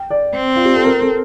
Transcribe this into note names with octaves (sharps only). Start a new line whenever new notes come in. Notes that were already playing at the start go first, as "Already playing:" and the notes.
Already playing: G5
D5
C4
F4
G4
A4
A#4
A4